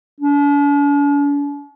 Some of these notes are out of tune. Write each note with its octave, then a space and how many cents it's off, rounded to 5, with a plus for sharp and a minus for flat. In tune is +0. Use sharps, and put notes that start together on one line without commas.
D4 -45